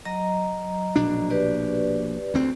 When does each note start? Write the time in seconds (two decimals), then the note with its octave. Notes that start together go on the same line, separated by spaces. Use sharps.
0.05 F#3 D#5 A#5
0.96 A#1 B2 D4
1.30 G4 B4 D5
2.34 D2 C4